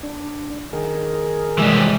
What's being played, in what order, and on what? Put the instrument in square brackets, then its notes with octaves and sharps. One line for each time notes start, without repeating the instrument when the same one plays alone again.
[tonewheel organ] D4
[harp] D#3 [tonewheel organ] G#4 A#4
[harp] C3 G#3 D#6 [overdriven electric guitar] E3 G3